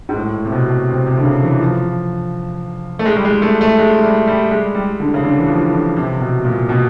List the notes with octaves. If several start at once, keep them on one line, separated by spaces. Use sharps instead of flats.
G#2
A2
C3
B2
C3
C3
D3
C#3
E3
F3
A3
G#3
G3
G#3
A3
A3
G#3
G3
G3
G#3
G3
D3
C#3
D3
E3
F3
D3
C3
B2
A#2
B2